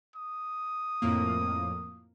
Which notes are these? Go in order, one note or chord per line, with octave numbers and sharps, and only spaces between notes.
D#6
F2 A2 A#3